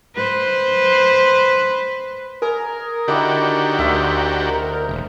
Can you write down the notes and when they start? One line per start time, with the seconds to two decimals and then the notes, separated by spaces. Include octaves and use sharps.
0.16 B4 C5
2.42 G#4 A#4
3.08 D3 D#3 E4 F#4 G4 D6
3.79 D2 C5 E5
4.89 E1